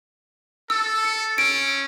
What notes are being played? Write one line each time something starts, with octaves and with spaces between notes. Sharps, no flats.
A4 E6
C#7
C#4 D7